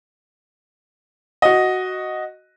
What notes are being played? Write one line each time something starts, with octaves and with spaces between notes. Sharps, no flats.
F#4 D#5